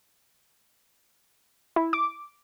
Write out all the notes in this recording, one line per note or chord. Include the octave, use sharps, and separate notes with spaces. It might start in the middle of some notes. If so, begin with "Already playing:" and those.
E4
D6